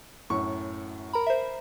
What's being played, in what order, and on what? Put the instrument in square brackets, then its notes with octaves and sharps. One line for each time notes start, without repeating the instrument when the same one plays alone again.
[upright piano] F#2 A2 C#6
[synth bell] A#4 A#5 B5
C5 E5